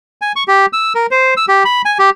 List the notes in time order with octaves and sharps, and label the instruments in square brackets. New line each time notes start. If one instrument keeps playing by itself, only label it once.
[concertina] G#5
C#6
G4
E6
A#4
C5
E6
G4
B5
G#5
G4